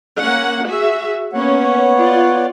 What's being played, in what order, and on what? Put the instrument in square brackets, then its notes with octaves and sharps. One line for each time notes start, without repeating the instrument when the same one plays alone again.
[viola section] A#3 C#4 F#5
F#4 G#4 E5
[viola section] A#3 C#4 [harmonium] B3 C#5 F#5
[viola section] F4 D5